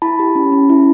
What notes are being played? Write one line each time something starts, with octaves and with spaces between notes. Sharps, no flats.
E4 A5 B5
G4
C#4
C#4
E4